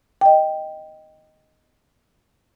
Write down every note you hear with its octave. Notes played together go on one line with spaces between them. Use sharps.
D#5 G5